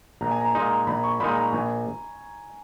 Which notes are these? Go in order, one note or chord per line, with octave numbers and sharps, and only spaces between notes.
A#1 A#5
G#5
A#5
A#2 G#3 D#4
A#1 B5
C#6
A#2 G#3 D#4 B5
A#5
A#1 G#5